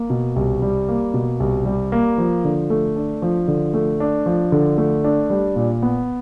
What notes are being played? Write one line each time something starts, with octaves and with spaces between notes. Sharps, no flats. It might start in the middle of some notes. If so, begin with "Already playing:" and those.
Already playing: A#3
B2
C2
G3
A#3
B2
C2
G3
A#3
F3
D3
A3
D4
F3
D3
A3
D4
F3
D3
A3
D4
G3
A#2
B3